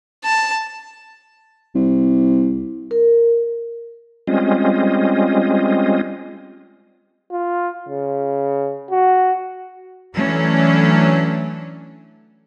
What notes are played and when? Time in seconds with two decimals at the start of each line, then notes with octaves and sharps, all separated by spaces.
0.25 A5
1.75 C2
2.91 A#4
4.27 G3 G#3 C4 C#4 F4 D#5
7.32 F4
7.89 C#3
8.91 F#4
10.16 E3 F#3 A3 C#4 D4